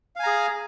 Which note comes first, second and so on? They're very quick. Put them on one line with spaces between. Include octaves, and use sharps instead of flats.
F5 G#5 A#5 G#4